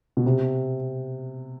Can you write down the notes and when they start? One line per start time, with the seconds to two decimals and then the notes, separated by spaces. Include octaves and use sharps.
0.17 B2
0.26 C3